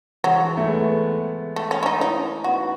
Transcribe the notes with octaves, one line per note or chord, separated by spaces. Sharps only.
E3 F#3 G#3
A3
G#3 B3
A3
C#4
E4
D#4
C#4 D#4 E4
B3 D#4 F#4